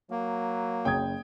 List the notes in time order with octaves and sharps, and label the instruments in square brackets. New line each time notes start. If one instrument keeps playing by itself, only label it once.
[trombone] F#3 [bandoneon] A#3
[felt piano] F#1 C#3 D#6 [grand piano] G5 G#6